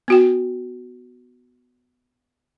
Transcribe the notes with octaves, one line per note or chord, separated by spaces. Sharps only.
B3 F#4 G5